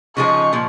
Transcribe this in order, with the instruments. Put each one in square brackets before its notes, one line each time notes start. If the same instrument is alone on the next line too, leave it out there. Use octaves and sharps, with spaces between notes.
[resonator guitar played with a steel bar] C#3 F3 G#3 D#4 G#4 [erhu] C#6
[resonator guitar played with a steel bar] A#2 F3